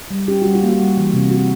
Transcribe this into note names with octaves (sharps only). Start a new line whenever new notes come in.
G3
C#4 G4
G3 F#4
F4
A#3
F#4
G3
E3
C3
G3 F#4